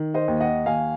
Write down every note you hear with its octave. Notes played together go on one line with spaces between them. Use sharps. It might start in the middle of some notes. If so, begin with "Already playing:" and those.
Already playing: D#3
C5 D#5
D#2
D#5 F#5
D#2 F5 G#5